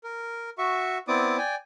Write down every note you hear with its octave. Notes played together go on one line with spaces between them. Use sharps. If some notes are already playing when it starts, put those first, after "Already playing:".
A#4
F#4 E5 C#6
B3 C4 E4 D5 D6 D#6
D5 G5 G#5